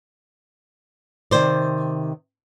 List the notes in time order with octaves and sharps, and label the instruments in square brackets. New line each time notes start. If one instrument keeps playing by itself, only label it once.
[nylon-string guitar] C3 D#3 C5 D5